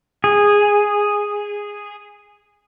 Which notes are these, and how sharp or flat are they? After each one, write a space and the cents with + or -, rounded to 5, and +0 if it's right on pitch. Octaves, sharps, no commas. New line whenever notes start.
G#4 -10